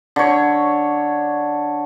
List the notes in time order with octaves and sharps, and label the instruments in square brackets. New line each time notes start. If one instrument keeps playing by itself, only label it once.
[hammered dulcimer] D3 C#5